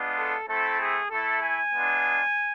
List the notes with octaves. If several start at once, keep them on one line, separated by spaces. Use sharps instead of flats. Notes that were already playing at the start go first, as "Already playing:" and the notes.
Already playing: G#3 B3 D4 F4
A4
A3 C4 E4 A4
G#4
A3 E4 A4
G#5
G#3 B3 D4 F4